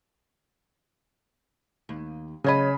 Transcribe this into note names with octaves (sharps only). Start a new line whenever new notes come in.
D#2
C#3 F#3 C#5 D#5 B5